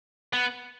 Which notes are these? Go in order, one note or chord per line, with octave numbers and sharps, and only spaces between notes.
B3